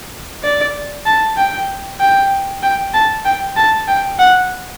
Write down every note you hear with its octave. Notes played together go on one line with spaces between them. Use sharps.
D5
A5
G5
G5
G5
A5
G5
A5
G5
F#5